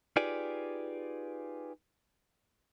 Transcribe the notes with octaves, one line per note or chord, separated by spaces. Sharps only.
D#4 F4 G4 G#4 B4 D5